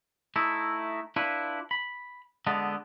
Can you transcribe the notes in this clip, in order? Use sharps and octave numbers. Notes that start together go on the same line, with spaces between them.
A3 D#4 E4
D4 E4 F4 B4
B5
D3 G#3 B3 D#5 A5